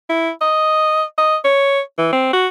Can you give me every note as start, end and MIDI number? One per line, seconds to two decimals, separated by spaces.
0.09 0.30 64
0.41 1.03 75
1.18 1.36 75
1.44 1.80 73
1.98 2.08 52
2.12 2.33 60
2.33 2.47 66